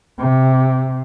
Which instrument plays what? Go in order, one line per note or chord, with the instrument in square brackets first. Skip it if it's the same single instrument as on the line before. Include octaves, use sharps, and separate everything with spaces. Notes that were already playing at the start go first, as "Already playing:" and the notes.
[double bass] C3